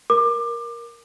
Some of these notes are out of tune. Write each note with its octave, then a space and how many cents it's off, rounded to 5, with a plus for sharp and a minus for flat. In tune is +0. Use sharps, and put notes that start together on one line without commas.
A#4 +10 D6 +25